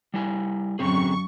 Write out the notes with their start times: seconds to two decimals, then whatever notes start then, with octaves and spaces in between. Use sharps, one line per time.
0.14 G3 E4 G#5
0.79 F#2 D3 C4 G#4 C#6